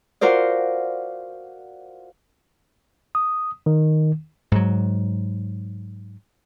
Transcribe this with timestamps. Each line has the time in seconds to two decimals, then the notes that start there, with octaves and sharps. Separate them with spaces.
0.21 F4 F#4 A#4 C5 D5
3.15 D#6
3.66 D#3
4.52 G#2 F#3